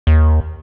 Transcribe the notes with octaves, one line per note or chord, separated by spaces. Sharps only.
D#2